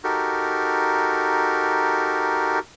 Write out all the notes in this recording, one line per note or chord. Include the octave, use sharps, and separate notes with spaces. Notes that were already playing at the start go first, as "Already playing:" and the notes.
D#4 F#4 G4 A4 A#4